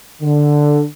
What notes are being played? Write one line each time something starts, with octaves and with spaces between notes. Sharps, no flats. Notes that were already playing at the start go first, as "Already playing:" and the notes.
D3